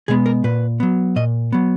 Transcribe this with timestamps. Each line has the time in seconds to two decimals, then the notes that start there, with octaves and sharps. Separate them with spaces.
0.08 B2 G#3 B3 G#4
0.26 A#4
0.44 A#2 B4
0.80 F#3 B3
1.16 A#2 D#5
1.53 F#3 B3